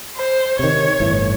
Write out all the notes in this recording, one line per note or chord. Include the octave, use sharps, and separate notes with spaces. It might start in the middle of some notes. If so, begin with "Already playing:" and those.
C5
C3 D#3 C#5
G1 A2 E3